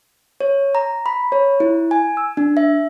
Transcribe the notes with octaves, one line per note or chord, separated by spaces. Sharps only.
C#5
A#5
B5
C#5
E4
G#5
E6
D4
E5